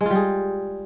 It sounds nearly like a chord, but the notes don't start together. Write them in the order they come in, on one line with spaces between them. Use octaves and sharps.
G#3 F4 G3 G#4